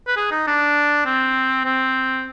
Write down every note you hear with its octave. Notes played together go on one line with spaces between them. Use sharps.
B4
G#4
D#4
D4
C4
C4